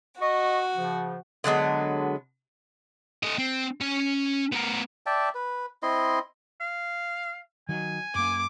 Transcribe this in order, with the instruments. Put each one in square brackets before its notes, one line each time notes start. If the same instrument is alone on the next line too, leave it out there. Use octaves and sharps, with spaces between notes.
[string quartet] F#4 [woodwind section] D#5 C#6
[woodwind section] C#3 F3
[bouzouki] D3 F#3 G#3 B3
[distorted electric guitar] A3 D#5
C4
C#4 G#5
B3 A#4
[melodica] D5 E5 G5 A5
B4
C4 E4 D#5 C6
[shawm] F5
[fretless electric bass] D#3 F#3 [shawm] G#5
[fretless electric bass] F#2 A#3 [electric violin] D6